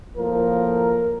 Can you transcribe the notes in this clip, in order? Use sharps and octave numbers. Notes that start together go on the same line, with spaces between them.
A2 F3 A#3 A#4